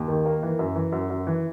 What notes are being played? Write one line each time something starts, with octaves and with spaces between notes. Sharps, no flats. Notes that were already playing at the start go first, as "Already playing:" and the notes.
Already playing: D#2
D#3
A#3
E3
F#2
E3
F#2
F#2
E3